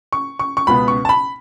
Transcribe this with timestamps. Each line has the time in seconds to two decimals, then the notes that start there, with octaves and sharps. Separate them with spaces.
0.13 C#6
0.39 C#6
0.57 C#6
0.67 C#2 B2 B3 B5
0.88 C#6
1.05 A5
1.09 B5